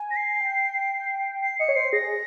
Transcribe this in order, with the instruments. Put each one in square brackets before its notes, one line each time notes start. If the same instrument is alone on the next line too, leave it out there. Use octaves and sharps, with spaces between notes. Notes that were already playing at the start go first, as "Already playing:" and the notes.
Already playing: [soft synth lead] G#5
[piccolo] A#6
C7
[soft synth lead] G5
[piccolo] C7
[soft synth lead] D#5 [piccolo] C#7
[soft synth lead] C#5
[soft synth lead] C5 [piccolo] C7
[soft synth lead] G#4 [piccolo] A#6